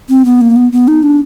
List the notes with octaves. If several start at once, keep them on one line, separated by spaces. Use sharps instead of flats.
C4
B3
A#3
B3
B3
D#4
D4